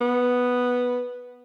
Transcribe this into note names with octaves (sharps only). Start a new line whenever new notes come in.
B3